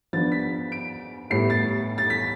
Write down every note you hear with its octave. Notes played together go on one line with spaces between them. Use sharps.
F3 B3 D4 A6
B6
D7
A2 G3 B3 E4 C7
A6
A6
B6